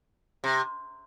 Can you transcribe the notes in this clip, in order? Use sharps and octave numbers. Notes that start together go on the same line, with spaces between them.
C3